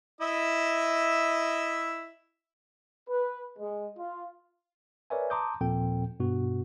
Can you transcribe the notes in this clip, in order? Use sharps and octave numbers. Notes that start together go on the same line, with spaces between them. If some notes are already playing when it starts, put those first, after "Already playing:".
E4 D#5 E5
B4
G#3
F4
A#4 B4 C#5 D5 E5 G#5
A5 A#5 C6 D6 D#6 G6
D#2 A#2 F3 C4 A4 G5
G2 B2 B3 F#4